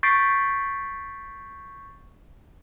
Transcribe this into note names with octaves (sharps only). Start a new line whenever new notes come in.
C#6 G6 A6 B6 C7 D7